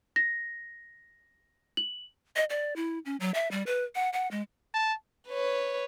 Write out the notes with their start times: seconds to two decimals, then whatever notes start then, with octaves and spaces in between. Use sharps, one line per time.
0.16 A#6
1.77 F#7
2.36 D#5
2.50 D5
2.76 E4
3.05 C#4
3.20 F#3
3.34 E5
3.51 G3
3.66 B4
3.95 F#5
4.13 F#5
4.31 G#3
4.74 A5
5.29 B4 C#5